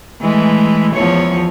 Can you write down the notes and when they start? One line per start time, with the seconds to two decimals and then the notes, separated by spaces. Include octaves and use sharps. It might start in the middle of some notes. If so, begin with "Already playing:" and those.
0.21 E3 G#3 A3
0.93 E2 F3 C#5